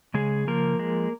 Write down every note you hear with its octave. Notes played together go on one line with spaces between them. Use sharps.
C#3 G#3 G#4
F3 A#3 A#4
G#3